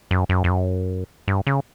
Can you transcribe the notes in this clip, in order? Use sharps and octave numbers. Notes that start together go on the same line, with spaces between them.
F#2
F#2
F2
F#2
G2
C#3